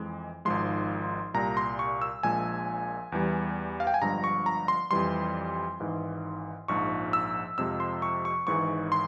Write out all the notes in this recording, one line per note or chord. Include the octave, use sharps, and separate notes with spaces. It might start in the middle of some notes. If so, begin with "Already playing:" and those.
Already playing: F2 E3 G#3
G#1 G#2 F3 G#3 C6
C2 A#2 G3 A#5
C6
C#6
E6
A#1 A#2 F3 G#3 G#5
E2 E3 G3
F5
G5
G#5
G1 G2 F3 G#3 A#5
C#6
A#5
C6
F2 E3 G3 C6
G#1 G#2 E3
A#1 G#2 F3 C#6
E6
F2 C3 F3 G#3 E6
C6
C#6
C#6
G#1 G#2 E3 G#3 C#6
C6